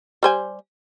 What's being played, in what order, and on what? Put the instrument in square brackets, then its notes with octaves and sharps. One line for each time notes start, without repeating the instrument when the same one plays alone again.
[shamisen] G3 C5 G#5